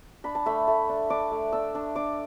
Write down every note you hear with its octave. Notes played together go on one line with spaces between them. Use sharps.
D4 B5
A5
A3 B5
A3
D4
D4 D6
A3
D4 E6
D4
D4 D6